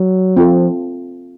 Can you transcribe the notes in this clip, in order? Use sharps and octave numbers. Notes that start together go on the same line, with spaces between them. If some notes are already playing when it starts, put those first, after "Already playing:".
Already playing: F#3
F3 C4 F4 A4